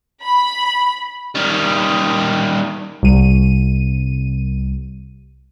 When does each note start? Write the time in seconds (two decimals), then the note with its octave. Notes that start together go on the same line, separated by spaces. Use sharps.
0.23 B5
1.35 D#3 G3
3.03 C2 D#7